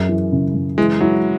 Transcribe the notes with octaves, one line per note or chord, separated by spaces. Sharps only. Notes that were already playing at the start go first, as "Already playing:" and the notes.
Already playing: F#2 G#4
E3
C#3
F#2
E3 G#3
F#3 E4